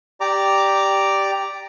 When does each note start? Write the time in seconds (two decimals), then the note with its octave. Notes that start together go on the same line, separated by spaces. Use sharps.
0.21 G4 D5 A#5 D6